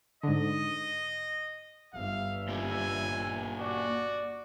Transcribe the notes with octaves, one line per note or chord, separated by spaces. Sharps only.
G#2 D3 D#5
G1 G2 E5 F5
A#3 F4 G4 G#5
F#4 D5